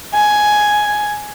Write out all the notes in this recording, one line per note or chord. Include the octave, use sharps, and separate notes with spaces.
G#5